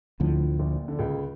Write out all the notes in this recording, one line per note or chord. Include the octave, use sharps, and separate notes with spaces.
D2 A2 D3 F3
A#1 A#2
D3
C#2 C#3